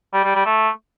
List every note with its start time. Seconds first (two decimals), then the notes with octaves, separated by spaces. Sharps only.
0.14 G3
0.24 G3
0.35 G3
0.46 A3